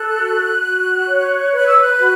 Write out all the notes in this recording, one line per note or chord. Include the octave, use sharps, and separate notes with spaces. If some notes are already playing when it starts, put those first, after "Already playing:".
Already playing: A4 F#6
F#4
F#4
C#5
B4 F#6
E6
F#6
F#4